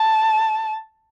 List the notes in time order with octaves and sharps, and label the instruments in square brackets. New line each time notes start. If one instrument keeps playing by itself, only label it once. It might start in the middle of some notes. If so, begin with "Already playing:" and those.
Already playing: [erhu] A5